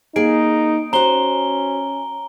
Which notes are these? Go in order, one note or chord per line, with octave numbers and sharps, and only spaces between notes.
A#3 D#4 G#4 D7
C#4 F#4 C5 A#5 G7